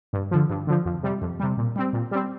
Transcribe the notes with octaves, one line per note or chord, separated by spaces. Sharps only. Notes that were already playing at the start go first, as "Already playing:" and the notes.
G2
D3 F3
G2
D3 F3
F2
C3 G3
F2
C3 G3
A#2
G3 C4
A#2
G3 C4